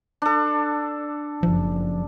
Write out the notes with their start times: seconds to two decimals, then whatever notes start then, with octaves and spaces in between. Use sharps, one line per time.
0.22 D4 A4
1.43 F#1 F3